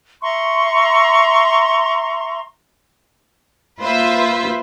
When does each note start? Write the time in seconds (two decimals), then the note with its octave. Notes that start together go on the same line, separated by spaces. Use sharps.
0.22 E5 A#5 C6 C#6
3.81 A#3 F4 B4 C5 E5